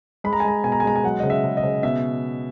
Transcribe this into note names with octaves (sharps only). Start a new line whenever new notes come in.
G#3 B5
A#5
G#5
G#3 A#5
B2 G#5
A#5
G#5
G#3 A#5
G#5
F#3 F#5
C#3 D#5
E5
C#3
D#5
C#3
B2 E5